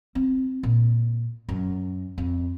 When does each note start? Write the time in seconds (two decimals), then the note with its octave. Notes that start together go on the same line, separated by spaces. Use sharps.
0.15 C4
0.63 A#2
1.49 F#2
2.18 F2